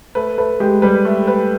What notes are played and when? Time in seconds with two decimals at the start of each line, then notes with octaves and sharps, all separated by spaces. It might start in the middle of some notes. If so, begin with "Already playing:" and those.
0.15 A3 B4
0.38 A3 B4
0.60 G#3 G4
0.82 G3 B4
1.05 A3
1.27 B4